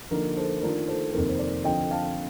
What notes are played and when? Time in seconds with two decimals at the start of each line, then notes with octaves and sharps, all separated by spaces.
0.11 D3 F3 A#3 D#4 A#4
0.37 A4 C5
0.62 D#3 A3 D4 F4 A#4
0.88 A4 C5
1.13 F2 C3 D#3 A#3 A#4
1.29 C5
1.39 A#4 D5
1.64 D3 F3 C4 F4 D#5 G5
1.91 F5 A5